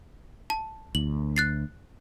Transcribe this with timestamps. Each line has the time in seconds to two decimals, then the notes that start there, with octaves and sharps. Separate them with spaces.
0.50 A5
0.95 D2 F#7
1.36 F#6 A6 C7